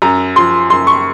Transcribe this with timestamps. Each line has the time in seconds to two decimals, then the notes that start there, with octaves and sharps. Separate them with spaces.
0.02 F#2 A#5
0.36 F3 C6
0.70 F#2 C6
0.87 C#6